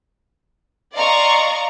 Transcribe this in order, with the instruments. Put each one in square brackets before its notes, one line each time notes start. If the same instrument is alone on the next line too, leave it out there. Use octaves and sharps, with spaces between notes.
[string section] D5 D#5 F5 A#5 C6 C#6